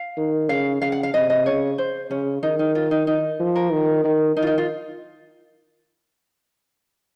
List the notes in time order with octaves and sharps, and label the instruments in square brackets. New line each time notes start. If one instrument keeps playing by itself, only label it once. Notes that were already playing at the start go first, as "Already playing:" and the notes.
Already playing: [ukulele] F5
[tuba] D#3
[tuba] C#3 [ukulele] F5
[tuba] C#3 [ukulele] F5
[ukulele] F#5
F5
[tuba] C3 [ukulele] D#5
[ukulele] D#5
[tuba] C#3 [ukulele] C#5
[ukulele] C5
[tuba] C#3 [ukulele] C#4
[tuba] D#3 [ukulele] D#4
[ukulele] D#4
F4
D#4
D#4
[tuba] F3
[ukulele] A#4
[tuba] D#3
D#3
[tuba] D#3 [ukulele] D#4
[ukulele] F4
D#4
F4